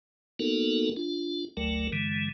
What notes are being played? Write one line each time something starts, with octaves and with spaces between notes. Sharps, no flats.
A#3 B3 D#4 F#4 A4 A#4
D4 F4
G1 D2 F#3 A3 A#4
G2 D3 E3 G#3